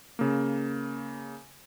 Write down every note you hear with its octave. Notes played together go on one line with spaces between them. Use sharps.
C#3 A#3